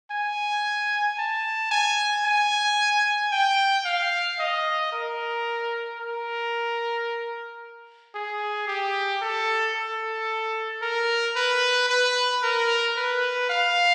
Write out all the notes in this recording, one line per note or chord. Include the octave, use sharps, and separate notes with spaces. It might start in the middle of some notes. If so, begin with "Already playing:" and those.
G#5
A5
G#5
G#5
G5
F5
D#5
A#4
A#4
G#4
G4
A4
A4
A#4
B4
B4
A#4
B4
F5